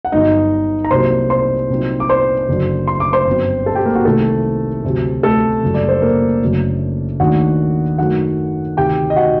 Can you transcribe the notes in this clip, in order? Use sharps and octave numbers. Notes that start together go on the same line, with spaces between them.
F#5
G1 G2 F#3 D#4 D#5
A#5
C2 C3 F#3 A#3 C5 C6
C5 C6
C2 A#2 F#3 C4 D#4
D6
C5 C6
F#1 F#2 D3 F#3
C6
D6
C5 C6
G1 F#2 F#3 C4
A4 A5
G4 G5
A#3 A#4
F#4
C2 C3 D#3 A3 A4
D2 C3 F#3
A3 A4
F#1 F#2 D3 G3
D5
C5
A#3 A#4
F#1 F#2 D3 F#3 A3
D#2 D#3 A3 D4 F#4 F#5
F#2 D#3 F#3 A3 F#4 F#5
D2 C3 D#3 G4 G5
D#5
F#4 F#5